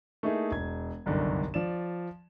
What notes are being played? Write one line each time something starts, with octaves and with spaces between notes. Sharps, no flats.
A3 A#3 D#4 E4 G#4
E1 G#6
G1 C2 F#2 D3 D#3
F3 D5 E7